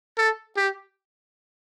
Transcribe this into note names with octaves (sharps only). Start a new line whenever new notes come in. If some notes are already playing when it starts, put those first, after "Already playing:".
A4
G4